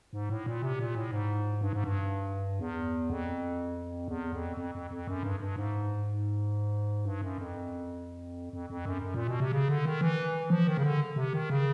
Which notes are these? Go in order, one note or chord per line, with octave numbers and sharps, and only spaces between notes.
G#2
A2
A#2
C3
A#2
A2
G#2
G2
G#2
G2
E2
F2
E2
F2
F2
F2
F2
F#2
G2
G2
G#2
G2
F#2
F2
F2
F2
F#2
F#2
A#2
B2
C3
C#3
D3
D#3
E3
F3
D#3
C#3
D3
C3
D#3
C#3